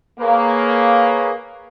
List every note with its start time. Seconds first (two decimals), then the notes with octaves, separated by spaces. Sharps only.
0.20 A#3 G#4 B4 C#5